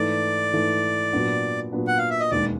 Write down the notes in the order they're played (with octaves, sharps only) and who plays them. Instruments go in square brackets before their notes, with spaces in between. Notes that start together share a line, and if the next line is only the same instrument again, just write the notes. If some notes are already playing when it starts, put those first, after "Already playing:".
Already playing: [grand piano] G#2 E3 A3 [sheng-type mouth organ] D5
[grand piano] G#2 E3 A3
A#2 F#3 B3 D4
A#2 F#3 B3 D4
[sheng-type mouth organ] F#5
F5
E5
D#5
[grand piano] E1 D#2 D#3 G#3 [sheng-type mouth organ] D5